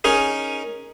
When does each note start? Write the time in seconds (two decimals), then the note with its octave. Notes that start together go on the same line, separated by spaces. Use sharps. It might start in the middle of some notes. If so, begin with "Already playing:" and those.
0.04 C#4 D#4 G#4 A#4 D#5